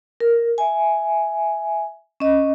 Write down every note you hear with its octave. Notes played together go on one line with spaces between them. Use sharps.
A#4
E5 G#5
C#4 D#5